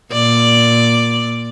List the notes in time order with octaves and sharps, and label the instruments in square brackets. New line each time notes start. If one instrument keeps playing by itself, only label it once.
[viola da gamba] A#2 D5